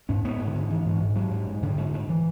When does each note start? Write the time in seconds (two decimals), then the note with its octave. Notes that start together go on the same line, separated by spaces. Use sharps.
0.09 G#2 C#4
0.25 G#2 B3
0.39 G#2
0.47 D3
0.55 G#2
0.70 G#2 E3
0.85 G#2
1.01 G#2
1.16 G#2 F#3
1.31 G#2
1.47 G#2
1.62 G#2 D3
1.77 G#2
1.93 G#2
2.09 E3